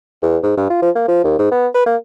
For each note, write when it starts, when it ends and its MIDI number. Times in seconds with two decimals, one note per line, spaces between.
0.22 0.38 40
0.43 0.53 44
0.57 0.66 43
0.70 0.78 65
0.82 0.90 53
0.95 1.07 58
1.08 1.24 53
1.24 1.38 39
1.39 1.49 44
1.52 1.67 59
1.74 1.84 71
1.86 1.96 58